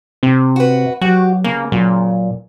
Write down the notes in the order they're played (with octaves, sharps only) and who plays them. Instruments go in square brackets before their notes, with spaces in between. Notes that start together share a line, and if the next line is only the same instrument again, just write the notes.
[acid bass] C3 [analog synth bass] C4
[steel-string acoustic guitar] F#4 B4
[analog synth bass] F#3 [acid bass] F#4 [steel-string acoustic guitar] G4
[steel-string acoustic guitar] C#3 [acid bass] A#3
[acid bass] A#2 [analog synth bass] F#3